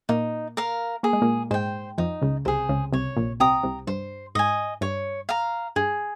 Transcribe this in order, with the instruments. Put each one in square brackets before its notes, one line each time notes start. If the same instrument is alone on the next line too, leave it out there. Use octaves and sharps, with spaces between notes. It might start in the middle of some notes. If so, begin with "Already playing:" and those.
[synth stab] A#2 A#3 [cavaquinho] D#4
[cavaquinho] A#4 F5
[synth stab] A#3 [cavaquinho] G#4
[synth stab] G#3
A#2 A#3
[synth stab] G#2 G#3 [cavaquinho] C5 G5
[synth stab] F2 F3 [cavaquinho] D#4
[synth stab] C#2 C#3
[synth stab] C2 C3 [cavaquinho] G#4 C5
[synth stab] C#2 C#3
[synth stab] C2 C3 [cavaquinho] C#5
[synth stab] A#1 A#2
[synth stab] C2 C3 [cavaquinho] G5 A#5 D#6
[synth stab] C2 C3
[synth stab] G2 [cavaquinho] C5
[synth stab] G#2 [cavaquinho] D#5 G#5
[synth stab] G2 [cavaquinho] C#5
[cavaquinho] F5 A#5
[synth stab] G2 [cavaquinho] G#4